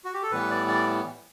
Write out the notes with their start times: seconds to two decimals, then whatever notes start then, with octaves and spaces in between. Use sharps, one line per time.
0.05 F#4
0.14 G4
0.23 A4
0.31 A2 E3 G3 B3 B4
0.50 D5
0.68 D5